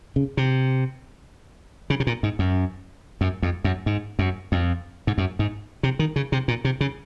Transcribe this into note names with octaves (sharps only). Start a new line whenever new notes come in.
C#3
C3
C#3
C3
A#2
G#2
F#2
F#2
F2
F#2
G#2
F#2
F2
G#2
F#2
G#2
C3
D#3
C#3
C3
A#2
C3
C#3